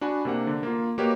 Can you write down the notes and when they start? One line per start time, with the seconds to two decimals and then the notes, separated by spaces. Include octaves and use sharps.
0.01 D4 F#4 G#5 B5
0.25 C3 A#3 D4 F#5
0.47 D3
0.63 A#3 F4
0.98 A#3 F#4 G4 B4 C#5 D#5